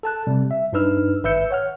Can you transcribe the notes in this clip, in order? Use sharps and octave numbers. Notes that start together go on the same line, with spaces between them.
A4 A5 F#6
C3 G3
E5
G2 D4 D#4 B4 E6 F6
G#1 B4 E5 E6 G6 C#7
C#5 F#5 F6